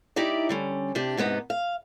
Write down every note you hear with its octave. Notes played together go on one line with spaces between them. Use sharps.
D#4 E4 G4 D5
D3 G3 C#4
C3 D4 G4
G#2 C3 B3 D#4
F5